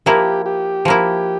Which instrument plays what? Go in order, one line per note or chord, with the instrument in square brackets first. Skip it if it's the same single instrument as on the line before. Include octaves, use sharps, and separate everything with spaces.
[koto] F3 A#3 E4 [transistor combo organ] G4
[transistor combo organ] G4
[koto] F3 A#3 E4